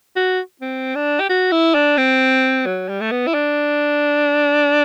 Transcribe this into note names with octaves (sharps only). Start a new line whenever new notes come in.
F#4
C4
D4
G4
F#4
E4
D4
C4
F#3
G3
A3
B3
E4
D4